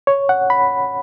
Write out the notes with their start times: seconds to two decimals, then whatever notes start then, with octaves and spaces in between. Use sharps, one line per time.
0.07 C#5
0.29 F#5
0.50 B5